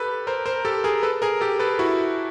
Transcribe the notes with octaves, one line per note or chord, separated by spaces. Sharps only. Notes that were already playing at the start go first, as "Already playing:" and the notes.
Already playing: G4 A4 B4
A#4 C5
A#4 C5
G4 A4
G#4 A#4
A4 B4
G#4 A#4
G4 A4
A4 B4
E4 F#4